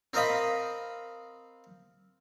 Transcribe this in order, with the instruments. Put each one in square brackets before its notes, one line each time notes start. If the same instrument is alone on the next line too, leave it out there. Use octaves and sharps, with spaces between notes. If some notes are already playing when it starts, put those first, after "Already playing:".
[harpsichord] C4 A#4 C5 D#5 F5 B5